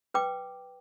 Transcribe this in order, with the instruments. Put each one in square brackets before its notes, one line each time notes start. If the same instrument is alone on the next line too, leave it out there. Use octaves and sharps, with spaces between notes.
[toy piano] B4 G5 D6